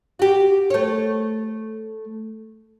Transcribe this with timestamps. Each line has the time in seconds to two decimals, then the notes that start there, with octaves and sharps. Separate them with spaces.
0.19 F#4 G4
0.70 A3 C#5